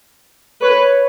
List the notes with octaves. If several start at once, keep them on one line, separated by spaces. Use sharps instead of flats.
B4 C#5